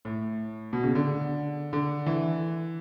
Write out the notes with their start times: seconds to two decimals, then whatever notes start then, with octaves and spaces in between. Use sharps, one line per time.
0.05 A2
0.73 B2
0.83 C#3
0.95 D3
1.73 D3
2.06 E3